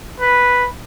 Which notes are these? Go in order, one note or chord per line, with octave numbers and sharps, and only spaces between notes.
B4